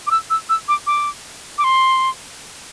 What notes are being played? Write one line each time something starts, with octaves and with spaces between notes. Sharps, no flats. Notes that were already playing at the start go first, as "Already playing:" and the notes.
D6
E6
E6
E6
D6
D6
D6
C6